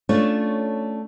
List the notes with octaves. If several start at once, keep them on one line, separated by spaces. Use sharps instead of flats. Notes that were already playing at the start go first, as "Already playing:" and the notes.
A3 C#4 D4 F4 C#5